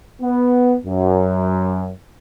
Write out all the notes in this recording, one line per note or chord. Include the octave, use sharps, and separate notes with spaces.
B3
F#2